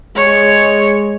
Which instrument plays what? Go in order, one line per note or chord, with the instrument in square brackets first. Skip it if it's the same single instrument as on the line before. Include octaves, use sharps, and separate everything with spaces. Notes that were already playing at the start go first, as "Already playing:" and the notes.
[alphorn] G#3 [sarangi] C#5